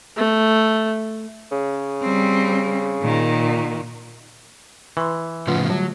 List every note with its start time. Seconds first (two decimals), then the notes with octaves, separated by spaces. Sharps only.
0.17 A3
1.52 C#3
2.03 G3 C4
3.02 A#2 D#3
4.97 E3 C6 C#6
5.48 A2 C#3 F3 F4 B4 F#5
5.70 D3 F#3 G3 A3